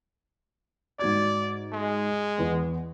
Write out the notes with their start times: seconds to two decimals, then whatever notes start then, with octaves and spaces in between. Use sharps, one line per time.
0.99 G#2 F#4 D5 G#6
1.73 G#3
2.38 E2 B3